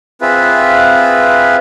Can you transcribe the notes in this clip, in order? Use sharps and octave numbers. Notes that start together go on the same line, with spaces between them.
C4 F4 G#4 B4 E5